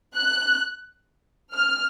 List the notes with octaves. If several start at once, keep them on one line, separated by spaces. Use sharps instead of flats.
F#6
F6